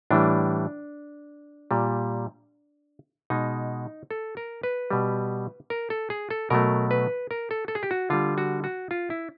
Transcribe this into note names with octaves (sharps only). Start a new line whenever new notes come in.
A2 E3 G3 D4
A#2 G3
B2 G#3 D#4
A4
A#4
B4
B2 G3
A#4
A4
G#4
A4
B2 F#3 A3 A#4
B4
A#4
A4
A4
G#4
G4
F#4
D3 G3 F4
F#4
F#4
F4
E4